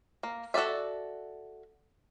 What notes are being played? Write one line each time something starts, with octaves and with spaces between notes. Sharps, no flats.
A#3
F#4 A4 B4 D5 E5